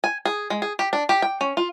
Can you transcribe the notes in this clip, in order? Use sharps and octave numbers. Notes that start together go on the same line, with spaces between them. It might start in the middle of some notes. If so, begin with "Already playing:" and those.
G#5
G#4
G#3
G#4
G4
D4
G4
G5
C#4
F4